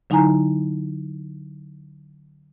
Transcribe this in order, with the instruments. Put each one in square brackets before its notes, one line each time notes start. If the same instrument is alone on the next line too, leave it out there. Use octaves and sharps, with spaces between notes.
[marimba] D3 F#3 D#4 E4 G#5 A#5